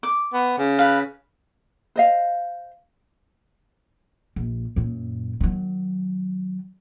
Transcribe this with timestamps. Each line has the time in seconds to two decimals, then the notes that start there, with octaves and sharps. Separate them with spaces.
0.03 D6
0.34 B3
0.58 C#3
0.79 B4 F5
1.96 C5 D#5 F5
4.36 A#1
4.76 F#2 A#2
5.41 D#3 F#3